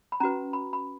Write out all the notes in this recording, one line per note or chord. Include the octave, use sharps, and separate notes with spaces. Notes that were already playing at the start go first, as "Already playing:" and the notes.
B5
C#4 F#4 B4 A#5
B5
B5